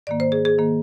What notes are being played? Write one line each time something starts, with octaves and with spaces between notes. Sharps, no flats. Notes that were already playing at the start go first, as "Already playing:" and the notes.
G#2 D#3 A#3 D5
C5
G#4
G#4
D#3 A#3